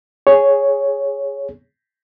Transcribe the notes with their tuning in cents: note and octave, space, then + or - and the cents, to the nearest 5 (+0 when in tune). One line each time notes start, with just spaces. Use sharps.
G#4 +0 C#5 +0